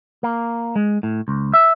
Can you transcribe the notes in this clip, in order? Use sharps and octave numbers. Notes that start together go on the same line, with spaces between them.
A#3
G#3
A2
C#2
E5